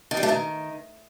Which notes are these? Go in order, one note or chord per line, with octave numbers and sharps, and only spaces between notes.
D#3
G3
A3
D#3